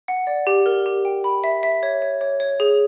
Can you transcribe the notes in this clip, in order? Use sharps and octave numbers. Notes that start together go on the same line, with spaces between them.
F#5
D5
G4
A#4
G4
G5
B5
E5
E5
C#5
C#5
C#5
C#5
G#4